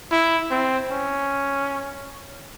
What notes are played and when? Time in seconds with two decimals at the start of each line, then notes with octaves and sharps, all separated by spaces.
0.12 E4
0.51 C4
0.92 C#4